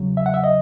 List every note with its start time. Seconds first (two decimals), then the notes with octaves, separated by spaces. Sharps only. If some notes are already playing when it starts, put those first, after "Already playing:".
Already playing: E2 C#3 F#3
0.17 E5
0.26 F#5
0.34 E5
0.44 D#5